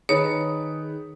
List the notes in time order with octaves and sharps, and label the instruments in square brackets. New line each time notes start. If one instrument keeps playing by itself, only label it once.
[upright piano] D#3 B4 [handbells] G#4 [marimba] C#5